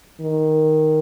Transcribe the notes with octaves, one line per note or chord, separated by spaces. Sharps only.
D#3